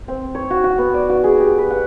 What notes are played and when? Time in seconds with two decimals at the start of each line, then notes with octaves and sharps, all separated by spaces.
0.08 C4
0.35 C#5
0.50 F#4
0.64 F#4
0.78 B3
0.94 D5
1.09 F#4
1.24 G#4
1.40 G4
1.58 B4
1.70 F#5